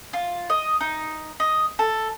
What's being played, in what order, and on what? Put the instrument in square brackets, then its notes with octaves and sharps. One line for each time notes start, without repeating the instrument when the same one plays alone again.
[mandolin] F4
D#5
D#4
D#5
A4